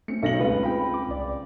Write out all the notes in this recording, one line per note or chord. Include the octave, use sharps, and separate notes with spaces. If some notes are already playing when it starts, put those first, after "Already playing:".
A3 C4 C#4 C#7
B1 A#6 F#7
C#2 G#3 F4 B4 F5
C4 G5 B5
D6
C2 D5